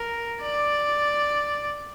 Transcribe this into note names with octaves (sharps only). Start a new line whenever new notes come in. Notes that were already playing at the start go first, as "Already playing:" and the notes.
Already playing: A#4
D5